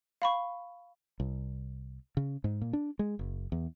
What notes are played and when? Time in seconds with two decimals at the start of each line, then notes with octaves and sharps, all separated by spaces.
0.22 F5 B5 C#6
1.20 C2
2.17 C#3
2.44 G#2
2.61 A#2
2.73 D4
2.99 G#3
3.19 F#1
3.52 E2